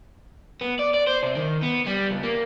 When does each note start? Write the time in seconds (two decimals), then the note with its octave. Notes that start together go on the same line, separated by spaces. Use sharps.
0.61 B3
0.79 D5
0.94 D5
1.07 C5
1.23 C3
1.36 D#3
1.62 B3
1.86 G3
2.10 C#2
2.23 A#3